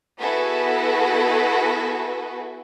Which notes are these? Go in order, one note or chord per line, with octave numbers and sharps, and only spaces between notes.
B3 E4 F#4 G#4 A4 B4